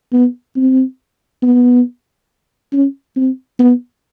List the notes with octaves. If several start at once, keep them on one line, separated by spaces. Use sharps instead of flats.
B3
C4
B3
C#4
C4
B3